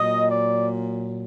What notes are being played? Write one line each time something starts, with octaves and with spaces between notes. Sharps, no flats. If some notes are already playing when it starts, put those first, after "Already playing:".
Already playing: A#2 F#3 D#5
D5